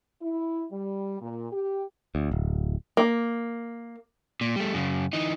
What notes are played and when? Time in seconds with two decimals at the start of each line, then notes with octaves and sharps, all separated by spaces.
0.21 E4
0.71 G3
1.20 A#2
1.52 G4
2.15 D2
2.31 D1
2.97 A#3
4.41 A#2
4.56 G3 A3
4.74 F#2 C#3
5.13 E3 D#4